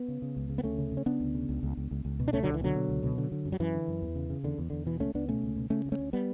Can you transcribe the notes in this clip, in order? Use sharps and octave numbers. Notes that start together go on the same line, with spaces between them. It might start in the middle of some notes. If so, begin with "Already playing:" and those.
Already playing: B3
C#3
C#3
C#2
C#3
B3
D2 A3 C#4
C#3
C#3
C#4
C#3 B3 D4
D2
C#3
C#2
C#2
C#2
C#2
C#2
B2
D4
C#2 A3 C#4
C#2 D3 F#3
E3
B2 D3 F#3
B2
C#2
B2
D3
D3
F#2
F#3
F#2 E3
D3
F#2
E2
C#3
C#3
E2 D3
E2
E2 D3
B2 E3
C#2 A3 C#4
C#2 B3 D4
B2 A3 C#4
C#2
B2
C#3 A3 C#4
D2
A3 C#4
D2
G3 B3